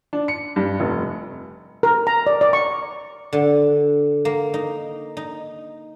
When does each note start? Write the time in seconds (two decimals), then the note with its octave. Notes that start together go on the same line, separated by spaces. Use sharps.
0.13 D4
0.28 C#7
0.56 G2
0.80 F1
1.83 A#4
2.07 A#5
2.27 D5
2.41 D5
2.53 C#6
3.33 D3
4.25 A#3
4.54 D#4
5.17 D#4